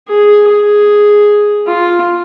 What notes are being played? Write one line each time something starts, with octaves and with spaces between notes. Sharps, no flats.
G#4
G#4
F4